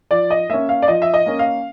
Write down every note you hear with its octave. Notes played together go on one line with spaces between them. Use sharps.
F3 D5
D#5
A#3 C#4 E5
F5
D5
F3 D#5
E5
D#5
A#3 C#4
F5